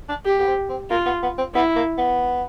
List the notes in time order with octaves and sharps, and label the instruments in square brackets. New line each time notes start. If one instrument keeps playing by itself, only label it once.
[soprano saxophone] D4
[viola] G4
[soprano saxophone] B3
C4
C4
[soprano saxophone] A#3 [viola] F4
[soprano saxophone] B3
B3
C4
[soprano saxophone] B3 [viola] E4
[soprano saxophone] A#3
B3